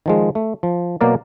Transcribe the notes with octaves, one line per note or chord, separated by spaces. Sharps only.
D#3 F3 G#3
A3
F3
B2 F#3 A#3 A#4 D5